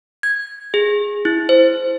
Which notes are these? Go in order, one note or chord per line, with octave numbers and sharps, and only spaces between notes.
G#6
G#4
E4
C5